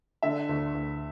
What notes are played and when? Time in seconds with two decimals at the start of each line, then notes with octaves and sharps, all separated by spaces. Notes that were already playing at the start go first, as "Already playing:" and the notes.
0.23 D3 E5
0.49 D2
0.75 D2